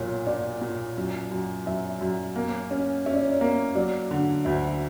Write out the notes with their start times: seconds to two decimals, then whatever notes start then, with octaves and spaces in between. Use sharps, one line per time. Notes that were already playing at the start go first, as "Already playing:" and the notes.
Already playing: B1 A#2 C#5
0.27 A#2 D5
0.61 A#2
0.97 F#2
1.31 F#2
1.66 F#2 E5
2.01 F#2
2.36 A#3
2.71 C#4
3.06 C#4 E5
3.14 D5
3.23 C#5
3.30 D5
3.41 A#3
3.75 F#3 D5
4.11 D3
4.45 D2 E5